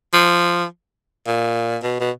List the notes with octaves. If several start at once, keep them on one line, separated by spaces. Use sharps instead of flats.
F3
A#2
B2
B2